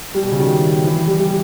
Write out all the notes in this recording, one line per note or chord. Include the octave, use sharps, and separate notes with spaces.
G3
B2
C#3
D#3
E3
E3
G3
G3